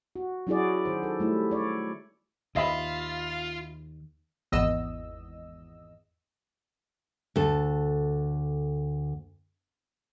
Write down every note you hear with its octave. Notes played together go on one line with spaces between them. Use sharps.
F#4
F#3 C#4 E4 F#4 G#4 D5
D#3 C5
A4
G3 A3 E4
C#5 D5
D#2 F4 D#5 E5 B5
G#1 E2 D#5 E6
D2 A4